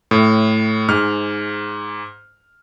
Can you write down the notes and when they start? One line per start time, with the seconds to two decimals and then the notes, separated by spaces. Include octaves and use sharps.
0.11 A2
0.89 G#2 F6